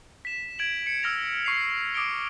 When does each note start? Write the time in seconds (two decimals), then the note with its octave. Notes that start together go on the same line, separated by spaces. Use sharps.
0.25 B6 E7
0.59 G#6 D7 F#7
0.86 C#7
1.03 E6 F6 A#6 F7
1.44 C#6 C7 F7
1.94 D6 D#6 C7 D7 G7